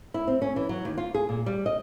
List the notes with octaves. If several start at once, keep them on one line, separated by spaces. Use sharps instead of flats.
E4
C4
C#4
E3
F#3
D#2
F4
G#4
A#2
G3
D#5